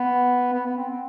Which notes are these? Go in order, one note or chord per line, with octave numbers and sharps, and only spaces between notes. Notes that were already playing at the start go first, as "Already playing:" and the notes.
Already playing: B3
B3
B3
C4
C4